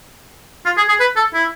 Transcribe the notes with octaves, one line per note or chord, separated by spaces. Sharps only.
F4
G#4
G#4
B4
A4
E4